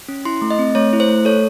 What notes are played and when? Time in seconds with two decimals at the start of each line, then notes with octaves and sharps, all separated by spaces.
0.08 C#4
0.25 E4 C6
0.42 A3
0.50 D#5
0.59 C4
0.75 A3 C#5
0.93 E4
1.00 C5
1.08 A3
1.25 A4 C#5